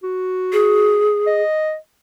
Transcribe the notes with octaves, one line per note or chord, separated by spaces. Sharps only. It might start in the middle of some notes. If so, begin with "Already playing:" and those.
F#4
G#4
D#5